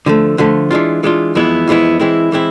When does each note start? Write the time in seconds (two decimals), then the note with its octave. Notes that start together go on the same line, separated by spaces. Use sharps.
0.06 D3 F3 A3
0.38 D3 F3 A3
0.71 E3 G#3 D4 F4
1.03 E3 G#3 D4 F4
1.35 F2 E3 G#3 B3 E4
1.68 F2 E3 G#3 B3 E4
2.00 E3 G#3 C4 E4
2.32 E3 G#3 C4 E4